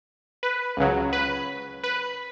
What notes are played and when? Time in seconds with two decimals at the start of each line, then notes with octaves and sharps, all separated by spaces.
0.43 B4
0.77 C#2 C#3 F#3
1.13 B4
1.83 B4